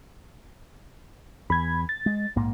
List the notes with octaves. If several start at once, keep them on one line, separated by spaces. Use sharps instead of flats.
E2 B5 G#6
A6
G#3
A#1 G#2 A#3